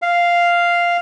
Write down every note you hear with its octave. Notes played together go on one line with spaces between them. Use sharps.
F5